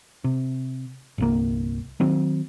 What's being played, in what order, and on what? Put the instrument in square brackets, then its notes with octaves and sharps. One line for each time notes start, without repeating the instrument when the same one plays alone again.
[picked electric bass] C3
G1 C2 A#3
D#3 F#3 C4